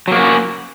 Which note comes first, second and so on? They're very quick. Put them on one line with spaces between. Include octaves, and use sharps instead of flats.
F#3 A#3 F#4 C#4